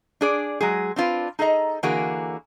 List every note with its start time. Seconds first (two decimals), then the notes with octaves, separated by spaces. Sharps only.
0.21 D4 G#4 D5
0.61 F#3 G#3 G#4
0.96 C4 D4 F4 B4
1.39 D#4 G#4 A4 D#5 A#5
1.83 D3 E3 A#3 F#4 G#4 A#4